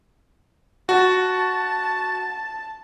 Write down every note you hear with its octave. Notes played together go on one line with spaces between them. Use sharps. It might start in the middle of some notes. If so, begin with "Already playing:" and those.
F#4 A5